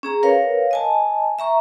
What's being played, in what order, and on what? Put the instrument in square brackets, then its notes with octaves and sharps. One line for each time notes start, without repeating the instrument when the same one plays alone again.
[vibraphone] C#4 G#4 A#5
A#4 B4 C#5 F5
D#5 G#5 A5
E5 A#5 C#6